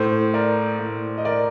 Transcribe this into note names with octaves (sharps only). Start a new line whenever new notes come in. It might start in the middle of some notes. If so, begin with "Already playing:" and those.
Already playing: A2 A4 C5
A#4 D5
A2
D#5
A#4 D5